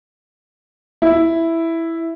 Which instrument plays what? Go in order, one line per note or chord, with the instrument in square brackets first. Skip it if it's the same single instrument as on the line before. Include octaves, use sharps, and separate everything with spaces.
[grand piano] E4